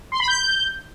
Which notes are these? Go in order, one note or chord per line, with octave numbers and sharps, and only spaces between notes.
C6
B5
G6